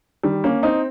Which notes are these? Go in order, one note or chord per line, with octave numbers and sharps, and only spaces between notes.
D#3 G3
A#3 C#4
C4 D#4